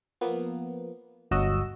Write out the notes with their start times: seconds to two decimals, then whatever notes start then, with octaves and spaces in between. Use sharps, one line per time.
0.21 F3 A#3 B3
1.31 G1 D2 F#3 F#4 D#5 E6